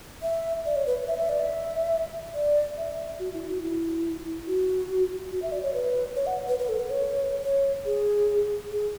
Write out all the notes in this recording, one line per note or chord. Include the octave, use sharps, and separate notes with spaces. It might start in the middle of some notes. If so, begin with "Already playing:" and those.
E5
D5
C#5
B4
E5
E5
D5
E5
D5
E5
F#4
E4
F#4
E4
F#4
F#4
E5
D5
C#5
B4
C#5
F#5
B4
B4
A4
B4
C#5
C#5
G#4
G#4